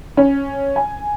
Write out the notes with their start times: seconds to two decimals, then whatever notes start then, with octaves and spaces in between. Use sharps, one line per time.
0.17 C#4
0.76 G#5